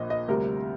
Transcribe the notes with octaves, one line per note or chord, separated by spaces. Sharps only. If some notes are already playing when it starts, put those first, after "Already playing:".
Already playing: A#1 A#2 D#5
D#5
D2 C3 G3 A#4